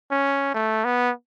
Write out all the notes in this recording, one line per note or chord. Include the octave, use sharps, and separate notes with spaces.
C#4
A3
B3